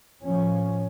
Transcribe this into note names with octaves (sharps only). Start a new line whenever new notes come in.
A2 F3 C#4